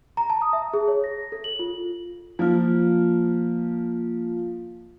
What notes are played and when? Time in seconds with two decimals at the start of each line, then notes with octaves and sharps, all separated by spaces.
0.17 A#5
0.30 A5
0.42 D#6
0.53 E5
0.74 G#4
0.88 C#5
1.04 A#6
1.32 A4
1.44 F#7
1.59 F4
2.39 F3 A#3 F4